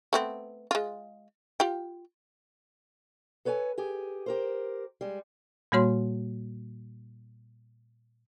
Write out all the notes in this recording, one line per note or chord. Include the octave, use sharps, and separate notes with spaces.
A3 B3 C4
G#3 F4
F4 G4 G5
A4 B4 C#5 G5 G#5
G4 G#4 G#5
G4 A#4 C5
G3 G#3
A#2 G3 A#3 F#4 C#5 C6